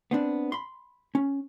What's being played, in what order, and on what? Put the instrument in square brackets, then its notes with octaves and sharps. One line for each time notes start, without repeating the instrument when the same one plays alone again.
[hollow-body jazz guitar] B3 C4 D4
B5 C6
C#4